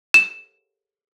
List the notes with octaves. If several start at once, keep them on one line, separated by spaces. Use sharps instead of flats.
E7